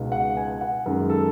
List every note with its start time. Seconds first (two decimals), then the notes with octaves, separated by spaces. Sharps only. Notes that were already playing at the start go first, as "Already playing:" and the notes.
Already playing: C#2 B2 G#3 D#4
0.12 F#5
0.37 G#5
0.61 F#5
0.86 F#2 D#3 G#3
1.10 A4